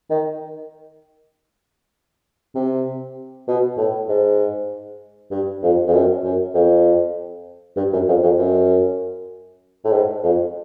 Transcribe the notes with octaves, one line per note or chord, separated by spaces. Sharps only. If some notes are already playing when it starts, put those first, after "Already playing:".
D#3
C3
B2
A2
G#2
G2
F2
F2
F#2
F#2
F2
G2
F#2
F2
F2
F#2
A2
G#2
F2